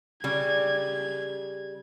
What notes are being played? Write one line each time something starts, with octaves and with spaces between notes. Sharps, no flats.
C#3 G3 G#6